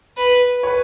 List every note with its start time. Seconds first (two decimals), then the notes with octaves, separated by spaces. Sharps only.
0.17 B4
0.63 C#5
0.67 B4